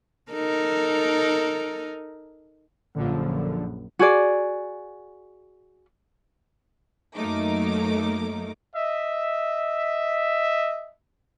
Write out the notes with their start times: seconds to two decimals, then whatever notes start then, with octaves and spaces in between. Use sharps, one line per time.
0.32 D#4 A4 A#4
2.95 A#1 F#2 D3 F3
3.99 F#4 G#4 D5
7.15 F#2 F#3 A3 A#3 D#4 D6
8.76 D#5 E5